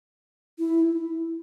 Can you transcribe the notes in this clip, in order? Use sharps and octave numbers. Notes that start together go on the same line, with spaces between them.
E4